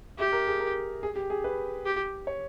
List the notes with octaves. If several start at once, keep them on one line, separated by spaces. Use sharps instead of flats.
G4 E5
A#4
G#4
A#4
G#4
G4
G#4
B4
G4
C#5